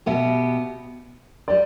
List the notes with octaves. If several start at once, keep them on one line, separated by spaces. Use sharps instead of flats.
B2 B3 G4 E5
G3 G4 D5